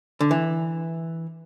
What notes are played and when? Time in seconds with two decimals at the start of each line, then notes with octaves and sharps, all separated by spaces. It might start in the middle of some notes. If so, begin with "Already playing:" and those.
0.21 D3
0.31 E3